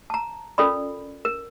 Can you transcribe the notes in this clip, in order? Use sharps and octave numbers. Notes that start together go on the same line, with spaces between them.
A5 A#5
C#4 F4 A4 A#4 D5 B5
A#4